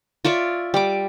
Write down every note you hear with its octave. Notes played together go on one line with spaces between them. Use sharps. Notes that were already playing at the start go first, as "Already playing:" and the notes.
F4 C#5 D5 E5
G3 D6